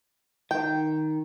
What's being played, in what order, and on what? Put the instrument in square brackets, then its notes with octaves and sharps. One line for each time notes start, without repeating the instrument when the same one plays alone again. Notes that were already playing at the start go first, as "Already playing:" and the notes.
[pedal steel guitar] D#3 [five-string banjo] G5